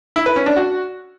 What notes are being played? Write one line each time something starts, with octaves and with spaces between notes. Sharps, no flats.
E4
B4
C#4
D4
F#4